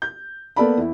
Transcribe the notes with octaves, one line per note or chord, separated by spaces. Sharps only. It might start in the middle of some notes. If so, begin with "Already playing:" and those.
G6
A#3 B3 A4 D5 A5 B5
E2 E4